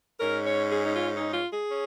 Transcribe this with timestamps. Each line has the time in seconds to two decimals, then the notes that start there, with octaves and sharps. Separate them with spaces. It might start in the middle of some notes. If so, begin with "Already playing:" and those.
0.20 G#2 G#3 C#4 A#4
0.45 C#5
0.70 G#4
0.85 D#4
0.95 F4
1.15 D#4
1.33 F4
1.52 G#4
1.71 C#4